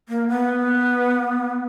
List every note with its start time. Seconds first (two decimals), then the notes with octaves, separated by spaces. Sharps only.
0.09 A#3
0.28 B3